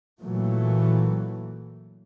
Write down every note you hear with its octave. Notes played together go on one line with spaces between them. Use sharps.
A#2 E3 F#3 A3